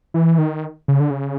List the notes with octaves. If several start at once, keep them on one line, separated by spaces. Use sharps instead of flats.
E3
D#3
C#3
D3
C#3